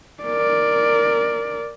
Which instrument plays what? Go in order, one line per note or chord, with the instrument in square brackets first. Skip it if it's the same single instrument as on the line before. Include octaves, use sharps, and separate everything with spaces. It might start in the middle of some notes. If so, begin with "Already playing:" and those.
[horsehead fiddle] A#4 D5